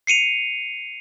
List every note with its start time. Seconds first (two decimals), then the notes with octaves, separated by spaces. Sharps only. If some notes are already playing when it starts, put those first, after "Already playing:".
0.07 C7 C#7 D#7 F7